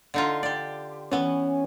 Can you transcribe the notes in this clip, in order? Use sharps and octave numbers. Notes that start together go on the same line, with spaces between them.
D3 D#4 F4
G4 D5
E3 B3 C#4